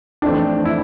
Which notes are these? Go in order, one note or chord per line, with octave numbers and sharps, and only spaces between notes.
F2 E3 A3 C4 D4
E4